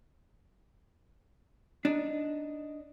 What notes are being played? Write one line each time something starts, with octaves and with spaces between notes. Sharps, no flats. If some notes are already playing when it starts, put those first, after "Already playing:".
D4 D#4